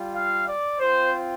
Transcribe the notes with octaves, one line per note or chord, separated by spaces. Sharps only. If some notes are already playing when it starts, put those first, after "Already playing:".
Already playing: G3 F4
F5
D5
C4 F4 C5